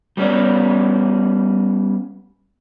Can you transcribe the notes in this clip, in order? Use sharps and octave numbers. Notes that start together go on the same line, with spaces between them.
G3 B3 C#4 D5